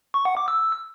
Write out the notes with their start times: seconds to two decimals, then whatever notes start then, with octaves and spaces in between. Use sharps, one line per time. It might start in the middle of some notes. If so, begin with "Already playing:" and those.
0.14 C#6
0.25 F#5
0.37 D6
0.48 E6